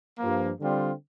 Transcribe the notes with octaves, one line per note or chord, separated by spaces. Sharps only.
G2 F3 A#3
D3 G3 C4 F4